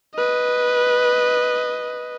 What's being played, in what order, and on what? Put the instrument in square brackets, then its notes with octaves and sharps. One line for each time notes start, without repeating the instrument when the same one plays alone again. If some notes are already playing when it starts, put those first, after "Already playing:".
[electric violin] B4 D#5